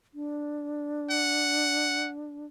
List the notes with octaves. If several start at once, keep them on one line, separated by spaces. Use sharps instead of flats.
D4
F#5